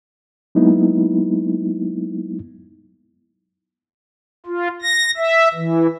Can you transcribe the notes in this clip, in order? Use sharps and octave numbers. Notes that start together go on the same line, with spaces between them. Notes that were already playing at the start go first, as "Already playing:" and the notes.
F#3 G#3 A#3 B3 D#4 E4
F4
A#6
E5
E3